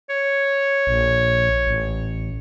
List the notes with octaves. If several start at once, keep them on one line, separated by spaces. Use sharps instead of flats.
C#5
A#1
A1